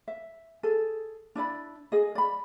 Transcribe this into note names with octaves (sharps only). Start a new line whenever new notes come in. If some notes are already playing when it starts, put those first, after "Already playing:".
E5
G#4 A4
D4 E4 D5 B5
G#4 D#5
D5 B5